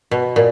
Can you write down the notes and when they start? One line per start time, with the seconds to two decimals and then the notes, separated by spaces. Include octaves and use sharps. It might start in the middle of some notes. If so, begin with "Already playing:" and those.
0.11 B2
0.36 A#2